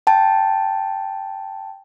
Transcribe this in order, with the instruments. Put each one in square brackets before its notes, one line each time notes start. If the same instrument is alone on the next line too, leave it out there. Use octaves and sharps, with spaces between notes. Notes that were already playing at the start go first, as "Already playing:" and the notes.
[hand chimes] G5 A5